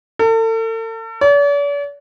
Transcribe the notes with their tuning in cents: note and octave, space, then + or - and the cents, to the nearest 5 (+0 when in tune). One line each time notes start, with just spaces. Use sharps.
A4 +40
D5 -45